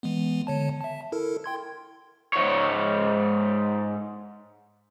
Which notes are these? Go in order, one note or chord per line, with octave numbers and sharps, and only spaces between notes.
E3 G#3 B3
D3 C#5 A5
E5 A5
E4 A4 A#4
G5 C6 G#6
G#2 C#5